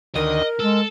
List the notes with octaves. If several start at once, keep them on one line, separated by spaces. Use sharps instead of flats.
D2 D#3 A#4 D#5
G#3 A4 E6